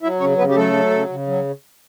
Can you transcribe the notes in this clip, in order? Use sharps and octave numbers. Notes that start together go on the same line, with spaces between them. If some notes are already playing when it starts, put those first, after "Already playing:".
F#3 E4 E5
C#3 C#4 C#5
C#3 B3 B4
G4
F#3 A3 A4
F#3
C#3
C#3
F#3